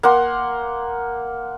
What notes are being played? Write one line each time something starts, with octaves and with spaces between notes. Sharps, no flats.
A#3 F#5 C6